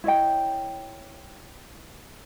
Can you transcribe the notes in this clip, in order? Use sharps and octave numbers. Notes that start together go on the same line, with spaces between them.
E4 C#5 D#5 G5